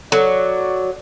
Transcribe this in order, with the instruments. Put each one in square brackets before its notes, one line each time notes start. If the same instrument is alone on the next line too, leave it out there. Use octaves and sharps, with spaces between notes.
[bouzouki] F#3 [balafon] A4 [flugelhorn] D5